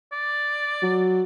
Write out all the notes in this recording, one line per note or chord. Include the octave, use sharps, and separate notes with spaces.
D5
F#3